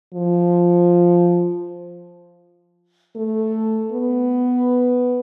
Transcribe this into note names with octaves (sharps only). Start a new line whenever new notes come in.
F3
A3
B3